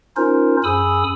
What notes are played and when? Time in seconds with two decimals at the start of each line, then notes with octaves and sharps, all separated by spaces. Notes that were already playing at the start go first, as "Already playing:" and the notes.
0.17 C#4 D#4 F4 A#4 C5
0.64 F#2 G#4 G#5 B5 D#6 E6